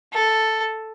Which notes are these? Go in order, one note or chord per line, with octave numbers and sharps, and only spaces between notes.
A4